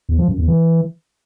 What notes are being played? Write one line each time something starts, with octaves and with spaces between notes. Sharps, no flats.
E2
F3
F#2
E2
E3